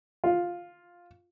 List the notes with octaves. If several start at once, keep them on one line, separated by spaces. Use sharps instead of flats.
F4